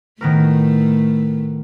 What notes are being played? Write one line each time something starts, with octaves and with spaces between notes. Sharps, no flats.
A2 D#3 A3 B3 A#4